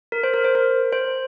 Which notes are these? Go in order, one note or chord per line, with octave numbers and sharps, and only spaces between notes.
A#4
C5
A#4
C5
A#4
C5